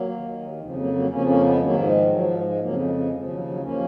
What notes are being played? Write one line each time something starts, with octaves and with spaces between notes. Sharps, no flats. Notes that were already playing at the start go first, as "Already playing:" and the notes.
Already playing: F#3 A#3
D#2 D#3
F2 C#3 F3 G#3
G#3
F#3 A#3
F#3 A#3
F2 C#3 F3 A#3 C#4
A#3 C#4
G#3 B3
G#2 D#3 F#3 A#3
F3 G#3
F3
G#2 F3 F#3
F3 G#3
F2 C#3 F3 F#3 A#3
F3 G#3
F3 G#3
D#2 C#3 F3
F#3
F#3
F#2 F3 A#3 C#4